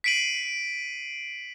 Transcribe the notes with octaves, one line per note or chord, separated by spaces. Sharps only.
B6 C7 D7 D#7 F#7